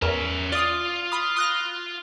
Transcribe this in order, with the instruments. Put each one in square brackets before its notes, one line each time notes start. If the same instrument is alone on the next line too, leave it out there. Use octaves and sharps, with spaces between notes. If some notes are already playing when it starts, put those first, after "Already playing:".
[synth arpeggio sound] E2 A#4 [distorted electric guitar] C#4 E5
[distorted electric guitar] F4 [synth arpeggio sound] D5 D#6
[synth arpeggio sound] B5 D#6
D#6 F#6 A#6